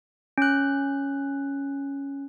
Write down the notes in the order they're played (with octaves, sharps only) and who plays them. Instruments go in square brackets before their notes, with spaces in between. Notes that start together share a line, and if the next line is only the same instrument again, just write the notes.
[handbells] C#4 F#6